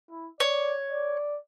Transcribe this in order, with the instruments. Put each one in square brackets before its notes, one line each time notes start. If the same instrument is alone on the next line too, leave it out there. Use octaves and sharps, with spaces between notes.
[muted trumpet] E4
[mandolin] C#5 [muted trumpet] D5
[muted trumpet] D5